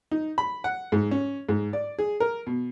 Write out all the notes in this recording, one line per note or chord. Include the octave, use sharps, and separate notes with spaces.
D#4
B5
F#5
G#2
C#4
G#2
D5
G#4
A#4
B2